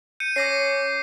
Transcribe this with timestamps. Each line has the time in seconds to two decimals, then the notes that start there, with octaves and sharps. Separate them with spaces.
0.20 G6 C#7 D#7
0.36 C#4 D6 A#6 C7